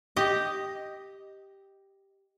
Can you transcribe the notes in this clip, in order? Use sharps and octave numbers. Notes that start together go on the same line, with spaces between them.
G4 D#5